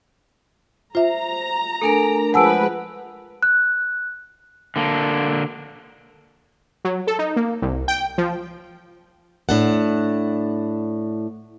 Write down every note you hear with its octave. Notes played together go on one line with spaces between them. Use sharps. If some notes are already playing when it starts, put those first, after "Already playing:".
F4 C5 E5 A#5
A3 D4 A4 A#4 G#5 D7
F3 G#3 B4 F#5 G#5 A5 E6 D7
F#6
D3 A#3 D4
F#3
A4
D#4
A#3
C2
G5
F3
A2 D4 F#5